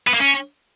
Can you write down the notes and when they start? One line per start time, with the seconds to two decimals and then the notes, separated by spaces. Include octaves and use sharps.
0.07 B3
0.14 A#3
0.20 C#4